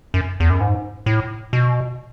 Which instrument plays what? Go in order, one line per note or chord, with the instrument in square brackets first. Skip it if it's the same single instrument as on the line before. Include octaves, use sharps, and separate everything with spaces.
[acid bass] F#2
E2
F#2
G#2
A2
B2